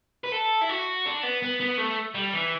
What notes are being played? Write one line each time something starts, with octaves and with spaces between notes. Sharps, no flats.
B4
A4
E4
F#4
D4
B3
B3
B3
A3
G3
E3